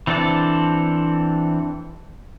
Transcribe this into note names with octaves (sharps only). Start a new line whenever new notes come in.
E3 C4 D4 A4 D5